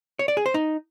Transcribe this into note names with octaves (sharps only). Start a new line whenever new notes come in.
C#5
D5
G#4
C5
D#4